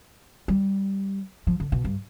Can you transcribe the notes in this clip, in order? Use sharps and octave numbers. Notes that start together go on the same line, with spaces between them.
G3
F3
D3
B2
G2